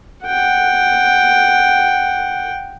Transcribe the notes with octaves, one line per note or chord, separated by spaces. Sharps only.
F#5 G5